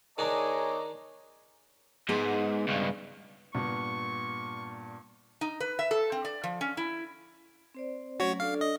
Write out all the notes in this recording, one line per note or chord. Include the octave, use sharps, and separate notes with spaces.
D#3 D4 D#4 G#4 C#5 D#5 A#5 D6
G#2 B3 G#4
C#2 G2
G2 A#2 B3 C#6
D#4
B4
E5
A4
C4
D5
F3
C#4
E4
C4 C5 D5
F#3 A3 C#4 F#4 C#5
D4 A4 D5 F5
D#5